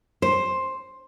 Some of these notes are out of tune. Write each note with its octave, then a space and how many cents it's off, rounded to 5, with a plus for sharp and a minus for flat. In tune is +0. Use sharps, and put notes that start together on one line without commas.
C5 +10